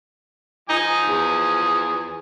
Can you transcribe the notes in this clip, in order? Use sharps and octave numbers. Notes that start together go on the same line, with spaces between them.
F3 D#4 G#5 D#6
E2